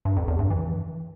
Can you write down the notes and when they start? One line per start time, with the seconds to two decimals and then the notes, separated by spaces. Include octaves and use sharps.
0.05 G2
0.17 F2
0.28 E2
0.39 G2
0.50 E3